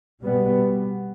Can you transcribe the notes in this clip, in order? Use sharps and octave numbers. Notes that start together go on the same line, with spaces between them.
B2 G3 B3